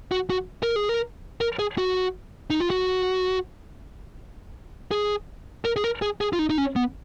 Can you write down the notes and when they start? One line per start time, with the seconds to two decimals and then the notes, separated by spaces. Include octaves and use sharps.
0.12 F#4
0.30 F#4
0.63 A#4
0.76 G#4
0.89 A#4
1.41 A#4
1.59 G#4
1.78 F#4
2.50 D#4
2.60 F4
2.70 F#4
4.91 G#4
5.65 A#4
5.76 G#4
5.84 A#4
6.02 G#4
6.21 G#4
6.33 F4
6.39 D#4
6.50 D#4
6.58 C#4
6.76 B3